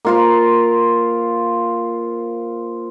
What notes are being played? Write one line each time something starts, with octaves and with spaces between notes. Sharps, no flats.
A#3 F4 C5